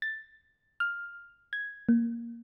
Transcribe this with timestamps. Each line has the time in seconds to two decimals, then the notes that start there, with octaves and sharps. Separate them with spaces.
0.02 A6
0.80 F6
1.53 G#6
1.89 A#3